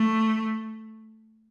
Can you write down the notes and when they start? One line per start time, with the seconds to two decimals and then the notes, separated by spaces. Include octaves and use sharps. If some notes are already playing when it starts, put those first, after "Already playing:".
Already playing: A3